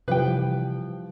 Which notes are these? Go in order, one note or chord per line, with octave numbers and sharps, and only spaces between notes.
C3 E3 F3 G3 B4 G5